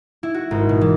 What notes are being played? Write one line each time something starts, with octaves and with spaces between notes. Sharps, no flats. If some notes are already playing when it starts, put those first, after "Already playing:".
E4
F#4
G#1
B2
E3